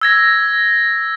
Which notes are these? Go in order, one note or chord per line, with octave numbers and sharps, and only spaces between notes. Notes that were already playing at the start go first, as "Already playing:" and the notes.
E6 G#6 A#6